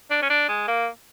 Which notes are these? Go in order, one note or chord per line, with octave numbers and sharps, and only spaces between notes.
D4
C#4
D4
G#3
A#3